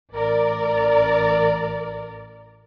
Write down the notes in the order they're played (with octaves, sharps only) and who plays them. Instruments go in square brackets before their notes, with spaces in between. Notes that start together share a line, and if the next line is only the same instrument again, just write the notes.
[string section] A1 A#4 D5